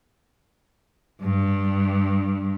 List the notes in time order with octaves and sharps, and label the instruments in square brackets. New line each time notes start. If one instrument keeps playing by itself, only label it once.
[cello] G2